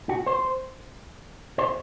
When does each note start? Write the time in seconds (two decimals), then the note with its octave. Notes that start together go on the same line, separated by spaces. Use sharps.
0.09 F#4
0.26 C5
1.58 C5